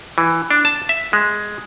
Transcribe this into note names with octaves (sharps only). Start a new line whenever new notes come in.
E3
D4
A5
E5
G#3